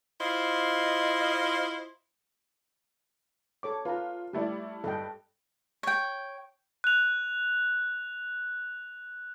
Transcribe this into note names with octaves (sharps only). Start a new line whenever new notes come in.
E4 F4 C5 D#5
A4 C#5 D6
F4 B4 F5 A#5
G3 A3 E4 G4 D5
G2 A4 D#5 G5
C#5 G5
F#6 F7